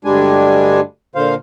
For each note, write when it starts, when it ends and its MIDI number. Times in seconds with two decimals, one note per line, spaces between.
0.05 0.80 38
0.05 0.80 43
0.05 0.80 55
0.05 0.80 56
0.05 0.80 62
0.05 0.80 80
1.15 1.35 46
1.15 1.35 50
1.15 1.35 72
1.15 1.35 77